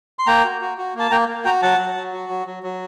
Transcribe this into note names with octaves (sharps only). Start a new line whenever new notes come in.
C6
A#3 G5 A#5
F#4
F#4
F#4
A#3 A5
A#3 G5 A#5
A#3
F#4 G5 A#5
F#3 F#5 A5
F#3
F#3
F#4
F#3
F#3
F#3